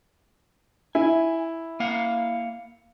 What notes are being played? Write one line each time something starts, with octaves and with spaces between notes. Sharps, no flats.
E4 G#5
A#3 F5 F#5